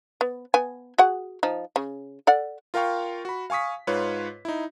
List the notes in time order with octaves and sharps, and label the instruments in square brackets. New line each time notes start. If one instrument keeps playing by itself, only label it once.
[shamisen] B3
B3 G#5
F#4 G#4 F#5
F3 D#4
C#3
A4 D5 F#5
[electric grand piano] F4 A#4 F5 G5 C#6
F#4 B5
F5 G#5 C#6 D#6 B6
G#2 F4 B4 C#5
D#4 E4